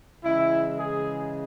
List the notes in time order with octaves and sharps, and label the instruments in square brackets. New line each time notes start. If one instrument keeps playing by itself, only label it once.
[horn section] C#3 E3 G#3 E4
G#4